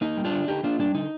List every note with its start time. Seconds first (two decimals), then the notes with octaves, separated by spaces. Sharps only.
0.01 A#3 D#4
0.17 G3
0.25 D4 F4
0.32 D3
0.48 D3 D#4 G4
0.63 A#3 D4 F4
0.79 G3 D4
0.95 D3 D#4